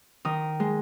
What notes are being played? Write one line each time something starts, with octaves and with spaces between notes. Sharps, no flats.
D#3 D#6
G#3